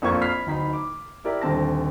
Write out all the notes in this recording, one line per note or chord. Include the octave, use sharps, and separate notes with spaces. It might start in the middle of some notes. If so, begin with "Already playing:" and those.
A#1 F2 A#3 F4 C#6 G#6
B5 F6 B6 C7
D1 D#4 B5 B6
D6
E4 G4 A#4 D5
D#1 D3 C4 A5 A#6